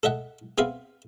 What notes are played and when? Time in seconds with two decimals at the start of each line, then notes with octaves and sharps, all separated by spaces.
0.03 A4 D#5 E5 F#5
0.58 B3 C4 G#4 E5 F5